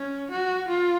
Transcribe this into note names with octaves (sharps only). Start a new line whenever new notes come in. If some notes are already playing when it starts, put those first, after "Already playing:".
Already playing: C#4
F#4
F4